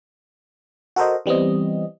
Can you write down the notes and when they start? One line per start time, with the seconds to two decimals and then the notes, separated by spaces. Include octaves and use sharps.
0.96 F#4 A4 A#4 C5 D#5
1.26 E3 G3 B3 C4 D#5